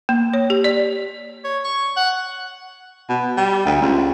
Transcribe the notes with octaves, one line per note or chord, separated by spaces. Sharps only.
A#3
C#5
G4
D5
C#5
C#6
F#5
B2
G3
D2
C#2